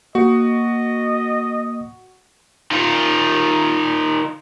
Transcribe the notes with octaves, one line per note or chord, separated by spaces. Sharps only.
A#3 F#4 D#5
D#3 F4